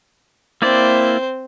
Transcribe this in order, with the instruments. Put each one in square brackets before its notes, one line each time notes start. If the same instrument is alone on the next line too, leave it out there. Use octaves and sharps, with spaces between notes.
[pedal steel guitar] A#3 E4 D5 [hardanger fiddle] C4 C5